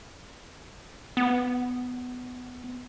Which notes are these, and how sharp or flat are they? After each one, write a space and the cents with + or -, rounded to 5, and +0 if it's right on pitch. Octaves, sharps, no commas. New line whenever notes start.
B3 +15